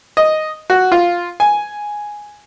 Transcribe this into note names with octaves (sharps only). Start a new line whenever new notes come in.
D#5
F#4
F4
G#5